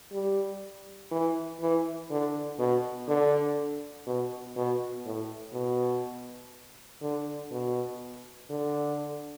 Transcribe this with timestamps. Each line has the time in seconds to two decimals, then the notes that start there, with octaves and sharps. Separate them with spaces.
0.12 G3
1.11 E3
1.61 E3
2.10 D3
2.59 B2
3.08 D3
4.07 B2
4.56 B2
5.06 A2
5.54 B2
7.02 D3
7.51 B2
8.50 D3